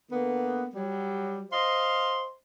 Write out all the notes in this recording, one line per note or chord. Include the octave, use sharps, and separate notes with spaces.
D3 A#3 B3
F#3 G3
C5 D#5 F5 C6